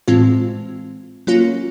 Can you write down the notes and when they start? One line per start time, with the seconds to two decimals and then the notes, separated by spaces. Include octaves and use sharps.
0.08 A2 E3 G#3 C4 F4
1.27 F#3 A#3 C#4 F4